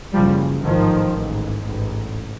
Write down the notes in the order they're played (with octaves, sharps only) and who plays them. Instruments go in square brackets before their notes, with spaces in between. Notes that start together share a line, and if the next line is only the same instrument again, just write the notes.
[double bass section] F#1 F#2 C#3 F3 G3
A1 G#2 D#3 F3
A1 G#2
A1 G#2